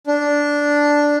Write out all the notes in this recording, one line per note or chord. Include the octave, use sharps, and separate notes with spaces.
D4